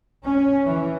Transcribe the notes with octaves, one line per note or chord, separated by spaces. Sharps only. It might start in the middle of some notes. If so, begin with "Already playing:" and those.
C#4
E3